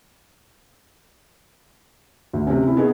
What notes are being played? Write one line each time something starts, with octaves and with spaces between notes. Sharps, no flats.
D2
C3 C#4
C4 E4
B3 D#4 G#4